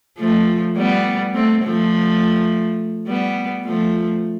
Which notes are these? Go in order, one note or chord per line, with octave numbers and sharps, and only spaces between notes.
F3 A3
G3 B3
A3 C4
F3 A3
G3 B3
F3 A3